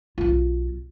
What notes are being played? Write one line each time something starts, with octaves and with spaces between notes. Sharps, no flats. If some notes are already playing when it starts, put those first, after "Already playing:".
B1 F4